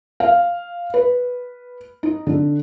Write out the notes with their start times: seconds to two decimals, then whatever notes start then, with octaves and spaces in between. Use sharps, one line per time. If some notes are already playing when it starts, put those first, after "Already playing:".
0.20 F5
0.94 B4
2.03 D#4
2.27 D3